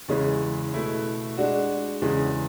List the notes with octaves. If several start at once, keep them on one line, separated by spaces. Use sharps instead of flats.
E2 C#3 E3 G#3 C#4
B2 A3 E4
G#3 D4 F#4
E2 C#3 G#3